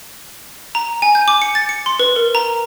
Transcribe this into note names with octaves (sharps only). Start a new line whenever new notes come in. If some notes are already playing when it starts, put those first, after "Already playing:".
A#5
G#5
G6
D6
C#7
A6
C#7
C6
B4
A#4
A#5